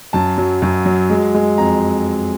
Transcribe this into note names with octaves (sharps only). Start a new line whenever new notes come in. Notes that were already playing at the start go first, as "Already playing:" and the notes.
F#2 A5
F#3
F#2
F#3
G#3
G#3
F2 A#5